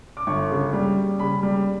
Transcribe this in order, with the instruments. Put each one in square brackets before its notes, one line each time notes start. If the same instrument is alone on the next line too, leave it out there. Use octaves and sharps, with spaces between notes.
[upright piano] D6
G1 C#6
C#3
G3
G3
C#3 B5
G3